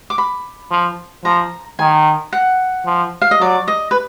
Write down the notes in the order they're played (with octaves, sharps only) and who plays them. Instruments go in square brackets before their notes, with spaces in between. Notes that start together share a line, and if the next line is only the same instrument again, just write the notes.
[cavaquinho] D6
B5
[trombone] F3
[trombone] F3 [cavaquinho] A#5
[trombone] D#3 [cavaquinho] G#5
[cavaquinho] F#5
[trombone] F3
[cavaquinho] F5
D#5
[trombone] F#3 [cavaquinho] D5
[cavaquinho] D#5
B4